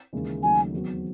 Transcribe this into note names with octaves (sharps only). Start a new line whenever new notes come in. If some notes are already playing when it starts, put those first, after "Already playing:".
D#2 C#3 E3 G#3
D#2 C#3 F#3 A3 D#4 G#5
E2 D#3 F#3 C4 F#4